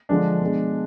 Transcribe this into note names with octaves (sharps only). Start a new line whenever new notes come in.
D3 F3 G#3 D4
B2 G#3